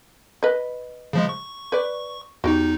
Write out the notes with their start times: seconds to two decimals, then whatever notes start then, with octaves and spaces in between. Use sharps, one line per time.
0.43 B4 D#5
1.13 C#3 F3 G#3
1.29 C#6
1.72 B4 D5
2.44 E2 D#4 F#4 G4